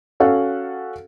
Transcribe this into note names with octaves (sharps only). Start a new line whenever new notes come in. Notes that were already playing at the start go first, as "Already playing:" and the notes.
C#4 F#4 A4 F5 F#5